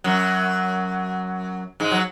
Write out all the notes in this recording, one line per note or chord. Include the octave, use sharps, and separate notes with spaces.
F#2 F#3
G#2 G#3
F#3